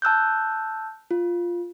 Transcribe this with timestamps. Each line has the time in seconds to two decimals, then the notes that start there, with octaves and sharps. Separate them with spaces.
0.02 A5 E6 F#6 G6
1.11 F4